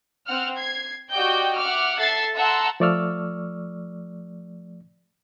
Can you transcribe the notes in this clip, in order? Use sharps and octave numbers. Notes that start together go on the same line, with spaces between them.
C4 F#5 F6
G#6 C7
F#4 G4 D5 D#5 G5 G6
E5 F#5 D6 F6
A4 E5 A6 C7
E5 F#5 A5 A#5 C6 E6
F3 A3 D5 C#6 E6 F6